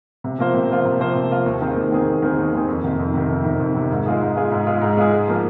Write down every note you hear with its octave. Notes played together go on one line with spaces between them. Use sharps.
C3
F3 A#3 F4 C5
C3
F3 A#3 F4 C5
C3
F3 A#3 F4 C5
C3
F3 A#3 F4 C5
D#2
D#3 C4 G#4
D#2
D#3 C4 G#4
D#2
D#3 C4 G#4
D#2
D#3 C4 G#4
F2
C3 D#3
F2
C3 D#3
F2
C3 D#3
F2
C3 D#3
G#2
G#3 F4 G#4
G#2
G#3 F4 G#4
G#2
G#3 F4 G#4
G#2
G#3 F4 G#4
G#2
F3 A#3